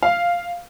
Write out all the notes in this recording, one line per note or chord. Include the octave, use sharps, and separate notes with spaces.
F5